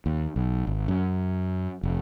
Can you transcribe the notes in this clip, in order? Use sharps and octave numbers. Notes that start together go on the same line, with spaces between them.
D#2
B1
G#1
F#2
F1